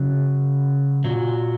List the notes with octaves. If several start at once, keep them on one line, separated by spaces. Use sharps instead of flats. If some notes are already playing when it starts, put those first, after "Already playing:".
Already playing: C#3 F#3
A#2 F#3